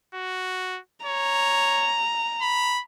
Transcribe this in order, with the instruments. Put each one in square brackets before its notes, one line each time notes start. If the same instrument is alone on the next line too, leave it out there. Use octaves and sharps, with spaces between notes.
[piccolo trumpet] F#4
[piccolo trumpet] C#5 [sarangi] A#5
[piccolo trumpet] B5